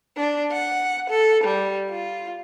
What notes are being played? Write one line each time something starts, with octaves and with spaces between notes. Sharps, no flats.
D4
F#5
A4
G3
F4